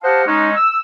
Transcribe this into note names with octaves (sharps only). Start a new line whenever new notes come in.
G4 C5 D#5 F5 F#5 A5
G#3 C#4 D#4
E6